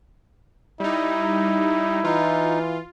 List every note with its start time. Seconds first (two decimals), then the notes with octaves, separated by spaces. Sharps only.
0.80 G3 D#4 E4
2.05 E3 D#4 F4